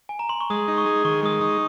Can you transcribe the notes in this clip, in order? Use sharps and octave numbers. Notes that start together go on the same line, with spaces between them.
G#5
A#5
C6
C#6
G#3 D#6
D#4
C#6
G#4
D#3 C#6
G#3 D#6
C#6
D#4